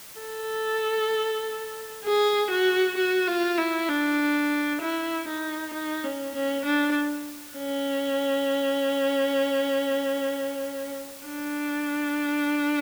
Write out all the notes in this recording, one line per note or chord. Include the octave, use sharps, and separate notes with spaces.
A4
G#4
F#4
F#4
F4
E4
D4
E4
D#4
D#4
C#4
C#4
D4
C#4
D4